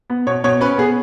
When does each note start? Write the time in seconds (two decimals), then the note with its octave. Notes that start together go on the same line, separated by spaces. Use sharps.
0.10 B3
0.27 B2 C#5
0.44 B2 C#5
0.61 C#4 B4
0.78 B3 G#4